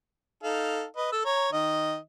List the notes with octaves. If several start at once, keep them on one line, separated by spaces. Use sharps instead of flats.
D#4 A4 F5
B4 D#5
A4 E6
C#5 A#5
D#3 D#5